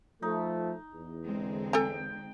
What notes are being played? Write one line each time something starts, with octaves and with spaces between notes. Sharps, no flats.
F3 A3 D#4
E2
D3 G#3 C4
A4 G5 G#5 A#5